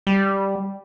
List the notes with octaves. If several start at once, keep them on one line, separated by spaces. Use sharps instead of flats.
G3